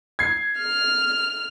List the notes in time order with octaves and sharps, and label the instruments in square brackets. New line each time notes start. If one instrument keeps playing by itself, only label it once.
[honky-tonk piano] G#6 C7
[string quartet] F6